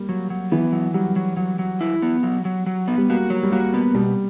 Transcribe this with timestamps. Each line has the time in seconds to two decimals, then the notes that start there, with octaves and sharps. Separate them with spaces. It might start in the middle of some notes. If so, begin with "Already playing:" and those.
Already playing: G3 A#3
0.09 F#3
0.30 F#3
0.52 E3 B3
0.72 F#3
0.94 F#3 G3
1.16 F#3
1.37 F#3
1.59 F#3
1.81 E4
2.02 B3
2.23 F#3
2.45 F#3
2.66 F#3
2.88 B3
2.98 G3
3.09 A#3 F#4
3.30 F#3
3.43 G3
3.52 A#3 F#4
3.74 B3
3.95 B2 G3